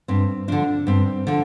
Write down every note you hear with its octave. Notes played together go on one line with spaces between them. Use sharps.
G2 C4
D3 F3 D4
G2 C4
D3 F3